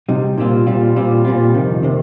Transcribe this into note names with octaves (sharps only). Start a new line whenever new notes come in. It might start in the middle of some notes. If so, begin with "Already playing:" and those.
C3 G3 D#4
A#2 G3 C4 F4
A#2 G3 C4 F4
A#2 G3 C4 F4
A#2 G3 C4 F4
F2 C3 D#3
C3 D#3